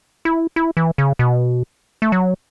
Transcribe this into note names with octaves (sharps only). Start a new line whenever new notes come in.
E4
E4
E3
C#3
B2
A3
F#3